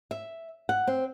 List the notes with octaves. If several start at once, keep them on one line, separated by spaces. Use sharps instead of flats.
E5
F#5
C4